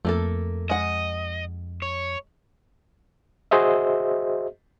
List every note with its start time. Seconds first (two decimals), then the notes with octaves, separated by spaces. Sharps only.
0.05 F2 A3 A#3 A4
0.70 G#3 D#5 F#5
1.82 C#5
3.51 F#4 G#4 C5 D#5 E5